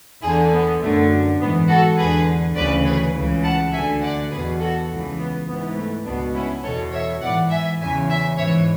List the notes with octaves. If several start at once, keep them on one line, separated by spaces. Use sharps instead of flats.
E2 D3 E4 G#4
B3
F#2 D3 A3
G#2 E3 B3
F#4 A4
E2 D3 G#4 B4
D2 C#3 E3 B4 D5
G#4 B4
C#2 C#3 E3
F#5 A5
D2 D3 E5 G#5
D5 F#5
E2 B2 G#4 B4
F#4 A4
C#2 C#3 E3
B3
G#2 E3 B3
A3
C#2 B2 B3 D4
C#4 E4
E2 B2 A4 C#5
C#5 E5
G#2 E3 D5 F#5
E5 G#5
E2 C#3 E3 E5 G#5
E5 G#5
G#2 E3 C#5 E5